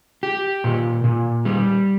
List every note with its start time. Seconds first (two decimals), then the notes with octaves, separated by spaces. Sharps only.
0.23 G4
0.64 A#2
1.04 A#2
1.45 G3